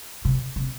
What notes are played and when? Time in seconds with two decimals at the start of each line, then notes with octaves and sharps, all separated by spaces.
0.25 C3
0.56 C3